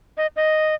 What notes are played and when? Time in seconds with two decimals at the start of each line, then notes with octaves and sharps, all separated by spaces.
0.17 D#5
0.36 D#5